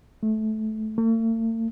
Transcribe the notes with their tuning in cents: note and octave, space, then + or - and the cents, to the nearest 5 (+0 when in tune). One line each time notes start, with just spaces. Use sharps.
A3 -20
A3 +45